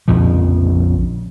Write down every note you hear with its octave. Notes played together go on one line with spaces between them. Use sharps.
A#1 F2 C#3 F3